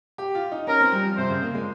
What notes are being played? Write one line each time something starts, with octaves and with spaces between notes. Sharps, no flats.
G4
F4
D#4
C#4 A#4
C4
G3
F3
C3 C5
C#3
A#3
G#3